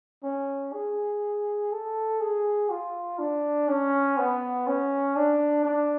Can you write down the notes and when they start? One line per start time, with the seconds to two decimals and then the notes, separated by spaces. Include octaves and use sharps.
0.24 C#4
0.73 G#4
1.72 A4
2.21 G#4
2.70 F4
3.19 D4
3.68 C#4
4.18 B3
4.67 C#4
5.16 D4
5.65 D4